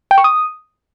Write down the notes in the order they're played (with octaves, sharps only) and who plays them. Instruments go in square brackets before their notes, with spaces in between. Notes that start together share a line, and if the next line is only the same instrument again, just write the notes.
[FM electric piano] G5
C#6
D#6